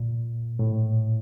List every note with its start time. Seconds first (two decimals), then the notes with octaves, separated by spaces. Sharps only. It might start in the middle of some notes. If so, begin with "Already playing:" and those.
Already playing: A#2
0.59 A2